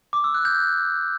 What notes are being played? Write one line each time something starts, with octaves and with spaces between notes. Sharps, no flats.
D6
E6
F#6
G6